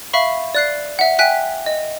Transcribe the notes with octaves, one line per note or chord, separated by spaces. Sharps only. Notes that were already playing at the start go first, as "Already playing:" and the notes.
E5 F5 B5 C#6
D5 F#6 C7
E5 F#5
E5 G5 G#5 F#6 B6
D#5